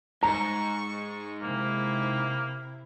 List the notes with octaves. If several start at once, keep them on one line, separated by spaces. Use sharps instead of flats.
G#2 A#5 C#6
C3 A#3 E4